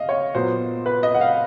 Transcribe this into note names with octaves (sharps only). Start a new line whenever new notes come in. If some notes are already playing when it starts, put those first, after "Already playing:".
Already playing: D#5 F5
C#5
A#2 F#3 B3 C5
B4
D#5
F#5
F5